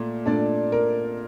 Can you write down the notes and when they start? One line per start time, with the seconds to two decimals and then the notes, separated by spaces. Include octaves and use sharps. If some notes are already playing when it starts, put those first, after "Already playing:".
Already playing: A#2 A3
0.26 A#2 A3 D4 D5
0.72 A#4